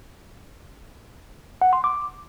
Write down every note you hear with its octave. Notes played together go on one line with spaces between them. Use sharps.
F#5
C6
D6